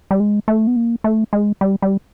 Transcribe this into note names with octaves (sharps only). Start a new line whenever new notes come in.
G3
G#3
A3
B3
A#3
A3
G#3
G3
G3